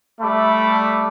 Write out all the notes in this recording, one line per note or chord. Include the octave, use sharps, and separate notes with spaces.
G3 A3 E5 B5 D6